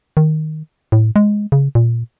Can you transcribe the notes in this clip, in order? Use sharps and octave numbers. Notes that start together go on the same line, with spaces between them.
D#3
A2
G#3
C#3
A#2